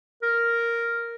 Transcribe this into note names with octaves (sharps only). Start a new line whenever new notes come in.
A#4